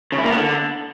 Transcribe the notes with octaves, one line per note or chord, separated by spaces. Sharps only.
C#3
E4
A#3
B3
D3